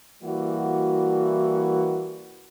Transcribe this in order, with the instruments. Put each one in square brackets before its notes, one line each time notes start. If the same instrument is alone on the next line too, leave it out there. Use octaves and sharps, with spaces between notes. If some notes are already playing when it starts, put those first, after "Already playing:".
[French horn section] E3 G3 A#3 E4 F#4